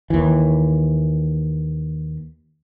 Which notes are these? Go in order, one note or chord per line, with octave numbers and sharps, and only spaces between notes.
D#2 E3